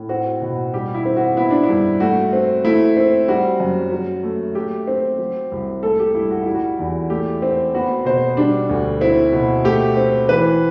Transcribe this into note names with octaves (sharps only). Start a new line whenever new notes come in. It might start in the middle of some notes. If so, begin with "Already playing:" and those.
Already playing: A2
C4 F#4
B2
G3 G4
E4
C4
F#4
B3 E4
D4
E4
G2
A3 F#4
C4
A3 E4
C4
G3 F#4
F#2
F#3
A3
A3 G4
C4
F#3
C2
A3 A4
G4
G2 E4
F#4
G3 E4
F#4
E2
A3 G4
C4
B3 F#4
B2 C5
G3 D4
D2
C4 E4
B2
A3 G4
C4
E3 B4